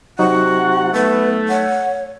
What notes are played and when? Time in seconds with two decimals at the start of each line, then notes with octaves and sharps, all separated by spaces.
0.19 C3 F#3 D#4 F#4 F#5 C#6
0.94 A3 B3 B4
1.49 C#5 F#5